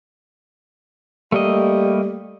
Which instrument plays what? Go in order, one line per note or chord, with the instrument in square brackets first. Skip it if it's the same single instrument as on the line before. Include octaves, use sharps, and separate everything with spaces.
[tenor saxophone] G3 [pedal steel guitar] A3 A#3 D#5